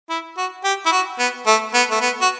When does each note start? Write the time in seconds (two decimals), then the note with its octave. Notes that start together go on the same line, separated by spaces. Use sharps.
0.10 E4
0.37 F#4
0.64 G4
0.86 E4
0.92 F#4
1.19 B3
1.47 A3
1.74 B3
1.91 A3
2.01 B3
2.21 F#4